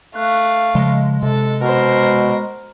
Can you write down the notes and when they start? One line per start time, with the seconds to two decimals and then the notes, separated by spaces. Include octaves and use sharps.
0.15 A3 F5 F#6
0.75 C#3 F3 G#3
1.23 C3 A4
1.62 B2 A#4 C5